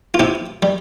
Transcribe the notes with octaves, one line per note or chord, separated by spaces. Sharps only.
F4
C3 E4 G4
G3